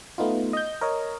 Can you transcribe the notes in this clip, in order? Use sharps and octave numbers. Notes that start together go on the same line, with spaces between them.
A3 B3 D#4 F4
D#5 G6
A#4 C#5 D#5